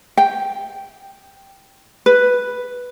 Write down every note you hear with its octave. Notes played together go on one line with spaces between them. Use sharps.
G5
B4